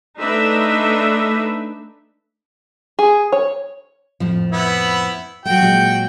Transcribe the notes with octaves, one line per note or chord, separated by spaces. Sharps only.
A3 D4 D#4 B4 E5
G#4
C#5
F2 A2 F3
B3 E4
F#3 A3 F#4 G5
A#2 F#3 G#3